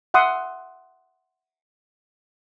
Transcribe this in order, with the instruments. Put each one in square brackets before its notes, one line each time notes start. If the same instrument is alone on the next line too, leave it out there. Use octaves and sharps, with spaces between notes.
[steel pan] E5 F#5 C6 D#6